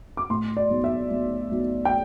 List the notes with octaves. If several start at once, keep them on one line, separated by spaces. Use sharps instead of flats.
D6
A2 C6
D5
B1
E5
B1
B1
G5